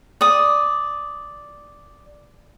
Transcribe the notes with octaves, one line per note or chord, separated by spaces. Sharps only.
D5 D#6